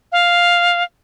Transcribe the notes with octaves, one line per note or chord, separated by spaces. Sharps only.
F5